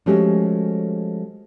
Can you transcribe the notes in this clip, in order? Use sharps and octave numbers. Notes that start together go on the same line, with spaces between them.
F3 G#3 A3 C#4 F#4 G4